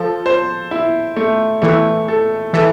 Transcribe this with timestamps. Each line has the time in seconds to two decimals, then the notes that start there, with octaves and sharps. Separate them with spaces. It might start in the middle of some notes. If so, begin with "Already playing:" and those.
Already playing: F3 A4
0.26 C5
0.71 E4
1.16 A3
1.62 E3 A3
2.08 A4
2.53 E3 A4